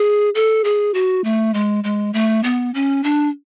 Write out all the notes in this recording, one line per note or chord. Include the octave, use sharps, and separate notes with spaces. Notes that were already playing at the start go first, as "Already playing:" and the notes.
Already playing: G#4
A4
G#4
F#4
A3
G#3
G#3
A3
B3
C#4
D4